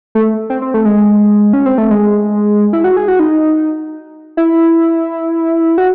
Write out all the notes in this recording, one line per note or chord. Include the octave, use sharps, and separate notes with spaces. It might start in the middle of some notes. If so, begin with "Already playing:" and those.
A3
C4
C4
A3
G#3
C#4
C4
A3
G#3
E4
F#4
G#4
F#4
D#4
E4
F#4